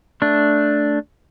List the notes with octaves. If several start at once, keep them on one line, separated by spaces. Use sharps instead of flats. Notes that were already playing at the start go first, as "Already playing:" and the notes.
A3 D4